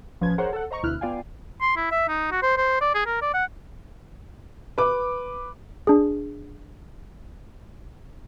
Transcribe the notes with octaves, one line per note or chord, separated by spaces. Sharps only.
A1 F3 C#4 B4 G#6
G#4 A#4 C5 C#5 F#5
A4 F#5
C5 D#5 A#5 C#6
D2 B2 E4 F6 F#6
B3 F4 D5 F5 G5 G#5
C6
E4
E5
D#4
F#4
C5
C5
D5
G#4
A#4
D5
F#5
B4 D6
D4 G#4